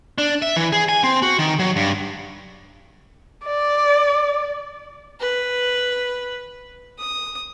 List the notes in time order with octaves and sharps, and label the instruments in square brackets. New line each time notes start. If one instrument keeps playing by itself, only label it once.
[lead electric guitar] D4
E5
E3
G#4
G#5
C4
F#4
D#3
F#3
G2
[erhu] D5
[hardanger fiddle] B4
D#6